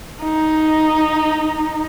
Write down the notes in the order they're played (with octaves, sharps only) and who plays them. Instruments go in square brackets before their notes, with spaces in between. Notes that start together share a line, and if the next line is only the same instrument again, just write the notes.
[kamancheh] D#4